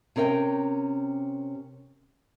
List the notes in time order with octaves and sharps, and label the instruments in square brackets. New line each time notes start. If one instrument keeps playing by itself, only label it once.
[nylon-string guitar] C3 C#4 A#4 E5 G5